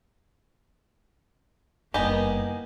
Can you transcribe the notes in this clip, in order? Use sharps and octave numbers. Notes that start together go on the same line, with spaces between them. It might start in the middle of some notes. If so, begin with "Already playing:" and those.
F#1 G2 A#3 B3 D#4 G4 G#5